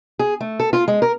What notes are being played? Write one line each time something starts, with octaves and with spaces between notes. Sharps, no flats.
G#4
A3
A4
F4
G#3
A#4